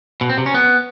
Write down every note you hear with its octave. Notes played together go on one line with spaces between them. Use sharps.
B2
C4
C3
C#4
B3